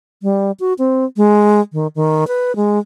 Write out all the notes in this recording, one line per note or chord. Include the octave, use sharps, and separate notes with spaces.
G3
F#4
C4
G#3
D#3
D#3
B4
G#3